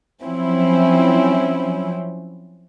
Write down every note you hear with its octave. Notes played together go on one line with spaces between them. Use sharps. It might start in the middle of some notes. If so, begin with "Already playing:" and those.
F3 F#3 C4 C#4 E4